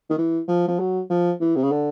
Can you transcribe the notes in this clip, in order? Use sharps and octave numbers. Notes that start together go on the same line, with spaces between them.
D#3
E3
F3
F3
F#3
F3
E3
C3
C#3
D3